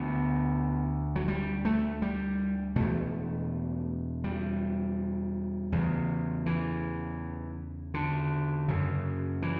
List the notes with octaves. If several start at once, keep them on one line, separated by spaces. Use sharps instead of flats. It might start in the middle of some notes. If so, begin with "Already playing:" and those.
Already playing: D2 D3 B3
F#3
G3
A3
G3
E2 B2 A3
G3
E2 C#3
E3
D3
F#2 C#3
E3